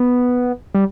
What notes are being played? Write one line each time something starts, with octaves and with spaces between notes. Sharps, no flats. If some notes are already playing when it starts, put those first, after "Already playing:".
Already playing: B3
G3